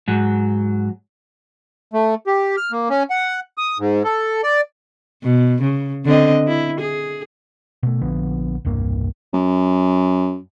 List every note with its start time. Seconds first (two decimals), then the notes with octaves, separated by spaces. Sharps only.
0.08 G#2 F#3
1.93 A3
2.27 G4
2.57 F6
2.72 A#3
2.90 C#4
3.10 F#5
3.58 D#6
3.79 G#2
4.04 A4
4.43 D5
5.23 B2
5.62 C#3
6.05 D3 C4 D#5
6.48 E4
6.80 G#4
7.83 B2 A3
8.01 A#1 D3 F3 B3
8.65 E1 C2 G2 A#3
9.33 F#2